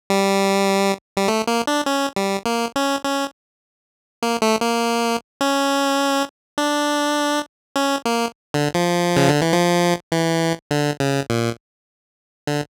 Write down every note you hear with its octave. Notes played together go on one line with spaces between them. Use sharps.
G3
G3
A3
A#3
D4
C#4
G3
A#3
C#4
C#4
A#3
A3
A#3
C#4
D4
C#4
A#3
D3
F3
C#3
D3
E3
F3
E3
D3
C#3
A#2
D3